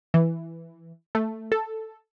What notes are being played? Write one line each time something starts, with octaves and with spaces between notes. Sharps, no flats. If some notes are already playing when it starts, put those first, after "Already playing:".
E3
A3
A4